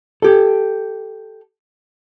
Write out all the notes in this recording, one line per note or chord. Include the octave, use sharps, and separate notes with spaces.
G4 A4